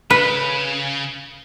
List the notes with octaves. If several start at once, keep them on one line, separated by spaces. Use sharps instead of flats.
C#3 B4